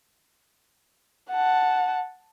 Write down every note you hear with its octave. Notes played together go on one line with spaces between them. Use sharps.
F#5 A5